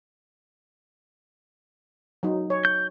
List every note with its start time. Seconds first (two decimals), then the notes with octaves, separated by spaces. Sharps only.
2.23 F#3 D#4
2.50 C#5
2.65 G6